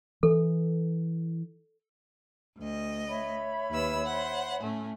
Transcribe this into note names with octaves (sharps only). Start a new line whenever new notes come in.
E3 A4
D2 D#5
C#5 E5 B5
D#2 B4 E6
C5 F#5
A2 A3 C#4